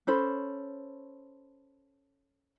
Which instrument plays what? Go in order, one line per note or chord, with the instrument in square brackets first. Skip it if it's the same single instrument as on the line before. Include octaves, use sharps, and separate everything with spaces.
[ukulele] C#4 A4 C5 B5